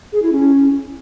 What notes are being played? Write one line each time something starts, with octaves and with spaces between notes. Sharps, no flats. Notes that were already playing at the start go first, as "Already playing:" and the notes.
G#4
E4
C#4